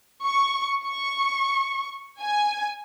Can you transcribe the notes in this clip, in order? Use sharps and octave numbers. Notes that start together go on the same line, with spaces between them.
C#6
C#6
G#5